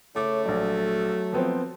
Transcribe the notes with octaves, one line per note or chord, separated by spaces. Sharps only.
C#3 A3 E4 C#5 D6
A#1 F#3 D5
F3 B3 C4